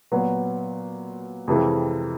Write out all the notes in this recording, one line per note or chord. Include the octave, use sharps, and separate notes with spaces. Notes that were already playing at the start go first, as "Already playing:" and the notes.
A#2 F#3 B3
F2 C3 E3 G#3